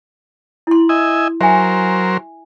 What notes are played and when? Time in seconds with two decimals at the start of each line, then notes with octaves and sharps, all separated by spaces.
0.67 E4 C6
0.89 D#5 E5 G#5
1.41 F#3 A#4 C5 E5 G#5